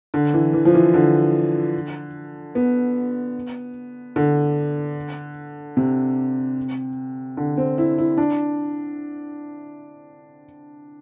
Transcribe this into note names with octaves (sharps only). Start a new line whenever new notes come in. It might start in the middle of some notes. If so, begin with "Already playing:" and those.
D3
E3
E3
F3
E3
D3
B3
D3
C3
D3
C4
E4
E4
D4